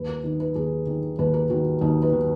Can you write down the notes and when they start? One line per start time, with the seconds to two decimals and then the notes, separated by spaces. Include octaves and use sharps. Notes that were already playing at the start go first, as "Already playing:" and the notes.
Already playing: D#2 B4
0.09 A#4
0.24 D#3 D#4
0.40 B4
0.55 D#2 G#4
0.87 D#3
1.19 D#2 B4
1.34 A#4
1.50 D#3 F#4
1.81 D#2 D#4
2.02 B4
2.13 D#3